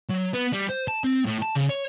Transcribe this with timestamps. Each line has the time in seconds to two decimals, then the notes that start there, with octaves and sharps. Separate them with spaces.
0.09 F#3
0.33 B3
0.52 G3
0.69 C5
0.88 A5
1.04 C4
1.26 A2
1.42 A5
1.55 C#3
1.69 C#5